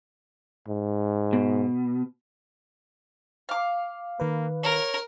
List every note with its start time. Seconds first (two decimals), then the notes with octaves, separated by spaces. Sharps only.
0.68 G#2
1.33 B2
3.49 F5 D6
4.20 D#3 A#3 B4
4.63 A#4 C#5